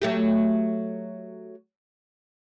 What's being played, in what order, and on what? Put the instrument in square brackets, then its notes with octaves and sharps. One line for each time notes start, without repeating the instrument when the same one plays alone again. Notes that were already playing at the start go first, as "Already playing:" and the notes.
[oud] F#3 A3 G4